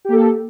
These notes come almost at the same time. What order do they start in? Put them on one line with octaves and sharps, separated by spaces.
G4 A#3 A4